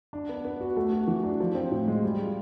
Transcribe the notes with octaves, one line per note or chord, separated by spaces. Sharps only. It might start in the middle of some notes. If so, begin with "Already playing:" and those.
D4
B3
B3
F#4
A3
F#4
E3
D4
F3
C4
A2
G#3
G3
F4